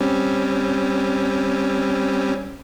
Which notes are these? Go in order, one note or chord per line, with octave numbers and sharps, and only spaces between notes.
G3 C4 C#4